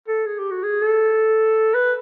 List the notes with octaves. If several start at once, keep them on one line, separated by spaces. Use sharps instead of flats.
A4
G#4
G4
F#4
G#4
A4
B4